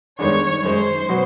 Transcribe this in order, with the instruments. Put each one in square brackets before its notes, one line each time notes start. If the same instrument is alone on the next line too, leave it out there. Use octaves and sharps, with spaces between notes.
[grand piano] G2 D#3 G#3 B3 D4 [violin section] C#5
[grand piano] F#2 D#3 G#3 [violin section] C5
[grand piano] B2 F#3 B3